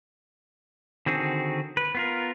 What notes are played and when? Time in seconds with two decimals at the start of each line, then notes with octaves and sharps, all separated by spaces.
1.06 D3 D#3 C4 F#4 G#4
1.77 B4
1.95 B3 F4 A#4